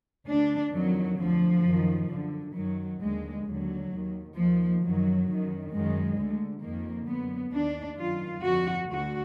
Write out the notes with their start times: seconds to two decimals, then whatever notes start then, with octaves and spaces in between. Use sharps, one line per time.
0.28 D2 D3 D4
0.73 F2 D#3 F#3
1.19 D2 D3 F3
1.64 F#2 D#3
2.09 F#2 D3
2.55 F#2 D#3 F#3
3.00 D#2 D3 G#3
3.45 D#2 D3 F#3
3.90 D#2 D#3
4.35 D#2 D#3 F3
4.81 F#2 D#3 F#3
5.27 F#2 D#3
5.71 F#2 D#3 G#3
6.17 D2 D3
6.62 F2 D#3 A#3
7.07 F#2 D3 B3
7.53 D#2 D#3 D4
7.98 F#2 D#3 F4
8.43 F2 D3 F#4
8.89 D2 D3 F#4